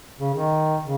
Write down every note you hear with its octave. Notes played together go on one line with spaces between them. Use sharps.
C#3
D#3
C#3